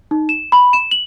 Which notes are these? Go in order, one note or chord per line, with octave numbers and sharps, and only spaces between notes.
D#4
E7
B5
E7
F#7